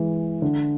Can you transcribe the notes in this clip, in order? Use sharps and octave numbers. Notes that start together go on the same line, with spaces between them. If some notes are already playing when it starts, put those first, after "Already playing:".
Already playing: E3 G#3
D3